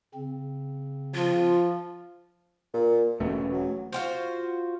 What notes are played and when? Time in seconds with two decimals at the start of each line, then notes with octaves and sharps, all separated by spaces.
0.14 C#3 C4
1.15 F3 F4
2.74 A#2
3.20 E1 B2 A3 C#4
3.53 F#3
3.93 F4 F#4 C5